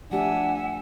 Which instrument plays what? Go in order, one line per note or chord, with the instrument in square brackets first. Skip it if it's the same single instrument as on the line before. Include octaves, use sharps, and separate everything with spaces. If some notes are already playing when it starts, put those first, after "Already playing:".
[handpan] F3 A3 G4 [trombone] D4 [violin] E5 G#5 [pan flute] F#5